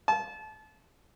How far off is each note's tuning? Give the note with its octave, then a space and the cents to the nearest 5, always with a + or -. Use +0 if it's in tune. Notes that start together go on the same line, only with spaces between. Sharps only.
A5 -30